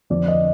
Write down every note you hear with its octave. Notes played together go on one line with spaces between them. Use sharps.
F2 D3 F3 D5
D#5